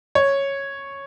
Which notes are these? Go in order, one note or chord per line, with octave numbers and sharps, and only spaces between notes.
C#5